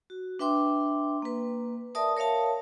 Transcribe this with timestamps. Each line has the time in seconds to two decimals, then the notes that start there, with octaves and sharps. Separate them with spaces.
0.10 F#4
0.39 D4 B4 E5 G5 C6 D6
1.22 A#3 B4
1.95 A#4 D5 E5 A5 D#6
2.17 A#4 C#5 E5 F5 A5